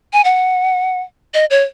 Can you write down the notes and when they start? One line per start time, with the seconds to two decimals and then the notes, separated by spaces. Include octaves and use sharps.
0.13 G#5
0.25 F#5
1.34 D#5
1.50 C#5